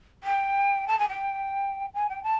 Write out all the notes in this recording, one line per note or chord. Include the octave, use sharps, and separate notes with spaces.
G5
A5
G#5
G5
G#5
G5
A5